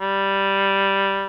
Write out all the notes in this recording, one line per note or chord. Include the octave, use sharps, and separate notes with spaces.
G3